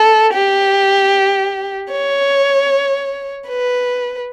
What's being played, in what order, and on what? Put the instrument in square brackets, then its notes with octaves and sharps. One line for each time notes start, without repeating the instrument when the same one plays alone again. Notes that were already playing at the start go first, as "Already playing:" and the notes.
Already playing: [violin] A4
G4
C#5
B4